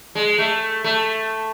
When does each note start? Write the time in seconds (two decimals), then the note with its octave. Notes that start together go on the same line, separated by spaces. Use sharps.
0.15 G#3
0.38 A3
0.84 A3